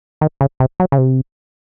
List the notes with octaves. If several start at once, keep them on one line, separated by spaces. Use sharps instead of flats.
D#3
C#3
C3
F#3
C#3
C3